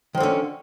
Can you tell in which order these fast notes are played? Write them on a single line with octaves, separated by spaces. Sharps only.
D#3 F3 D3 C#4